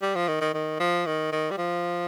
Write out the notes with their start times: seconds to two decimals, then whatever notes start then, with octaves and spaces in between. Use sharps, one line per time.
0.02 G3
0.15 F3
0.28 D#3
0.41 D#3
0.54 D#3
0.80 F3
1.06 D#3
1.32 D#3
1.51 G3
1.58 F3